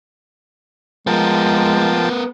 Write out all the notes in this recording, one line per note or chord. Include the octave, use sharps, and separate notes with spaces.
F3 G#3 B3 A#4 G5 A5